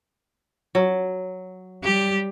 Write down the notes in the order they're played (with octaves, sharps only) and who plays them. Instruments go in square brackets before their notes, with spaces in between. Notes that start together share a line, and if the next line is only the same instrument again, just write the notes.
[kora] F#3
[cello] G3 G4